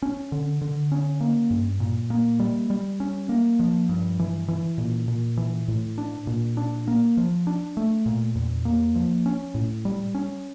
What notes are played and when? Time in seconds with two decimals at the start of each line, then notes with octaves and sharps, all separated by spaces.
0.02 C#4
0.32 D3
0.61 D3
0.92 C#4
1.20 A#3
1.51 G2
1.80 A#2
2.10 A#3
2.40 G3
2.70 G3
3.00 C#4
3.29 A#3
3.59 F3
3.89 G2
4.19 E3
4.48 E3
4.78 A#2
5.08 A#2
5.37 E3
5.68 A2
5.98 D4
6.27 A#2
6.57 D4
6.87 A#3
7.17 F3
7.47 D4
7.77 A3
8.06 A#2
8.35 E2
8.65 A#3
8.95 F3
9.26 C#4
9.55 A2
9.85 G3
10.15 C#4